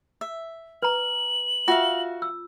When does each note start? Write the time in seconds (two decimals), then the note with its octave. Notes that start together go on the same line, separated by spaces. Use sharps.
0.21 E5
0.82 B4 A#5 F#7
1.68 F4 F#4 E5 F5
2.22 E6